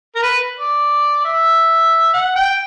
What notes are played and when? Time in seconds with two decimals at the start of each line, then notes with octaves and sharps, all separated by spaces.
0.15 A#4
0.22 B4
0.59 D5
1.25 E5
2.13 F#5
2.36 G5